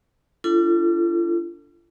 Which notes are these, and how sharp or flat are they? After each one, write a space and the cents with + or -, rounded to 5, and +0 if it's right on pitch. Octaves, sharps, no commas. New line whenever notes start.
D4 -15 F4 -45 A4 +10